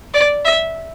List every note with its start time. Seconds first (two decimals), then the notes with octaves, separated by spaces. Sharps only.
0.14 D5
0.45 E5